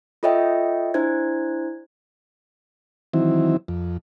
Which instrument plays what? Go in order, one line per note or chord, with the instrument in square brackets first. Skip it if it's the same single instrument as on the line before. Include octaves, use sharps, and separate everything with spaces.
[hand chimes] F4 A4 C#5 D#5 E5 G5
D4 E4 C5 G#6
[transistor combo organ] D#3 E3 F#3 C4 E4
F2